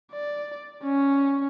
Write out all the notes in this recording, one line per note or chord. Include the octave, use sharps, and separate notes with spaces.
D5
C#4